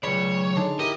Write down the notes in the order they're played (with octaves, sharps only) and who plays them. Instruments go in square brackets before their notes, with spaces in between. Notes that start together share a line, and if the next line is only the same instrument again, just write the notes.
[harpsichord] C#2 [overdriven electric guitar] F#3 D5 [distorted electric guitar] C#5 [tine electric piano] B5
[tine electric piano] D3 D#4 [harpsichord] G#3 D4
[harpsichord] E4 G4 [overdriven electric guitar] A#4 [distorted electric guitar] D#5